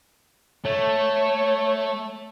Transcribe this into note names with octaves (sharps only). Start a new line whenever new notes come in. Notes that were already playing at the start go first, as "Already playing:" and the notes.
A3 C#5